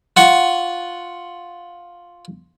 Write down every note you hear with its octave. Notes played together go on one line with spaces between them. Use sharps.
F4 F#5 C#6